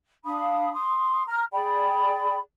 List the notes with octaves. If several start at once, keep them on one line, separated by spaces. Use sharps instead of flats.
D4 F5 B5 D#6
C6 D#6
A#5 F6
G#4 D5 G5 B5